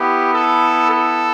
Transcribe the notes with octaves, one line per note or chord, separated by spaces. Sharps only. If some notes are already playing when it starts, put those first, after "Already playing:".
Already playing: B3 E4 G4
A4
A4